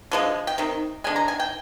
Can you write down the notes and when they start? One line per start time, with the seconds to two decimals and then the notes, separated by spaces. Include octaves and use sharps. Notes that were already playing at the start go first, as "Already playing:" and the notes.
0.12 D3 F3 G#3
0.47 G5
0.58 C3 D#3
1.04 D3 G#3 G#5
1.16 A#5
1.28 G#5
1.40 G5